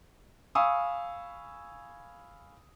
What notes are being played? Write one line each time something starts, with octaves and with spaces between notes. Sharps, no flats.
F5 G#5 B5 C#6 D#6 E6